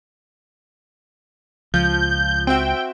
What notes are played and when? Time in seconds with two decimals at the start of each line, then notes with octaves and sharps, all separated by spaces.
1.74 C#2 F3 G6
2.47 C4 F#4 E5 G5